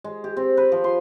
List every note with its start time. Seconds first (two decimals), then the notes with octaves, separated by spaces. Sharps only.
0.04 G#3
0.24 G4
0.37 C4
0.57 B4
0.72 F3
0.84 C6